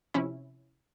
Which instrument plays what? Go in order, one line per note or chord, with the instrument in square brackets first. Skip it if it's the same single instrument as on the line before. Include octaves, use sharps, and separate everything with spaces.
[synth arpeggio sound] C3 F3 C#4 E4